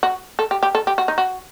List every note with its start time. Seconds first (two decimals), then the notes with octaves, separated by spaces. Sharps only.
0.03 F#4
0.39 A4
0.51 G4
0.63 G4
0.75 A4
0.87 G4
0.98 F#4
1.08 D#4
1.18 F#4